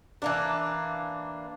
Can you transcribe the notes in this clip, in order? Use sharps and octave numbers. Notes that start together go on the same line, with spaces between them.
E3 A#3 D4